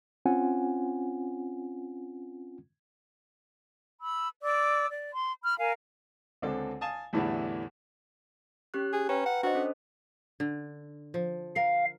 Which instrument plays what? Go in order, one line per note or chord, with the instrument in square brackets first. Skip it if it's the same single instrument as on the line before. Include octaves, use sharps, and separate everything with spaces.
[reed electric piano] C4 C#4 F4 F#5 G#5
[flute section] B5 E6
D5 D6 E6
D5
C6
B5 F6
A#4 F5 G#5
[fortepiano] C#2 D3 C4 A4
F5 G#5 A5 D#6
E2 A2 D3 E3 G3 A3
[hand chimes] C#4 G4 F#6
[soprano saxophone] G#4
[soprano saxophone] C#4 [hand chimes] B4 G5 A#5
[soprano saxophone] F#5
[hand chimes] D4 C5 D#5 [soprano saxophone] F#4
[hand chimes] C#4 A4
[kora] D3
F3
[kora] A#4 [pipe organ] F5